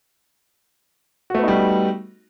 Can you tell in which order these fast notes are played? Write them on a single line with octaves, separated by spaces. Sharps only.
F#4 A3 B3 D#4 G3